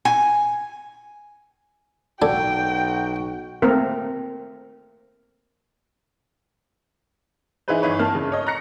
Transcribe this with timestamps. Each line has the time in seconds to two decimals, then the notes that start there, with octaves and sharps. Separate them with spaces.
0.05 G#5
2.22 B1 D4 F#4 A4 G5 G#5
3.62 A3 A#3 C4 A#4
7.68 E3 D#4 E4 G#4 B4 C5
7.82 G1 E3 D#4 B4 C#5
7.99 A#3 A5 F6
8.15 G1 C#3
8.32 C#5 D#5
8.47 A#5 F#6 A#6 C#7